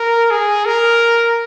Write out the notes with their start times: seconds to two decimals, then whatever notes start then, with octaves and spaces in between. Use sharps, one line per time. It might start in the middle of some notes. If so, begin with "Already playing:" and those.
Already playing: A#4
0.31 G#4
0.65 A#4